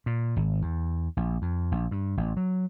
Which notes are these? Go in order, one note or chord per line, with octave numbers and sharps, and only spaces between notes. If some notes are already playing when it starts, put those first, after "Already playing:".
A#2
G#1
E2
A#1
F2
A#1
G2
A1
F#3